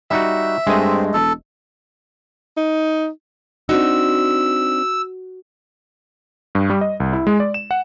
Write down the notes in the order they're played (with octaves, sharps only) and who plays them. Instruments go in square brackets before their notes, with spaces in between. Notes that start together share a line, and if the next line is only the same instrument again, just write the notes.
[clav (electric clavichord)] G3 D#4 F#4 [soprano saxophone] E5
[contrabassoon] G2 [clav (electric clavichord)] G#3 A3 D#5 [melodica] C4
[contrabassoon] E1 [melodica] A4
[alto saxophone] D#4
[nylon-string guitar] C4 D4 D#4 [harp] F#4 [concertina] E6
[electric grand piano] G2
G3
D#5
C2
E4
G#3
D5
E7
F#5